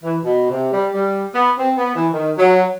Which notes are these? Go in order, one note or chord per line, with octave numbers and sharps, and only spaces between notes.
E3
B2
C3
G3
G3
B3
C4
B3
E3
D#3
F#3